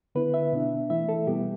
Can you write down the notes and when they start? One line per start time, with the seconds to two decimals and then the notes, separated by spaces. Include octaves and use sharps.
0.15 D3 B3 E4 B4
0.34 E5
0.52 B2 B3 D4
0.90 E3 A3 E4 E5
1.09 A4
1.27 B2 G3 B3 G4